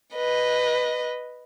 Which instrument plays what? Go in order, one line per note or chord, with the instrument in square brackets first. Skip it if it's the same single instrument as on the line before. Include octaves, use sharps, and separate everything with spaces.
[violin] B4 D#5